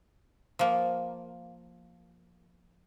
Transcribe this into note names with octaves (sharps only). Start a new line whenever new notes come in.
F3 A#3